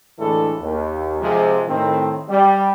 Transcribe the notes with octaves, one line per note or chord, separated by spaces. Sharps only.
D2 A2 E3 G#3 D4 A4
D#2
C3 F3 G#3
A2 D#3 C4
G3